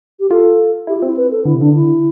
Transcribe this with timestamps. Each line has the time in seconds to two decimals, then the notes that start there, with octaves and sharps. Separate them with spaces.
0.20 G4
0.30 F4 A4
0.87 E4 G4
0.97 F4
1.02 C4 E4
1.17 B4
1.31 A4
1.45 D3 E4
1.54 C3
1.60 D3 D4
1.74 E4